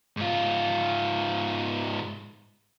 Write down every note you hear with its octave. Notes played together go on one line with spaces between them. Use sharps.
G#2 F4